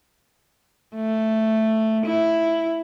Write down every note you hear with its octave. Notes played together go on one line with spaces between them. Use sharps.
A3
E4